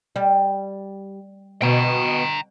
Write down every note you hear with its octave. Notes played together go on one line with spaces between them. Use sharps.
G3
B2 G5 A#5